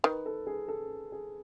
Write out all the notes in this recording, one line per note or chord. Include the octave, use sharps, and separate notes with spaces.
D#3 B4
A4
G#4
A4
G#4